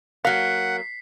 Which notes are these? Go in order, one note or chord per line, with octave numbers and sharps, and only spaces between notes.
F#3 A#3 F5 F#5 B6 C7